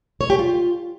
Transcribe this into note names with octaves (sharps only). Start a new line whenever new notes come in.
C#5
G4
F4